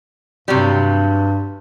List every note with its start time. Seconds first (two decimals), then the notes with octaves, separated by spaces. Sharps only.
0.48 G2 C3 F#3 G3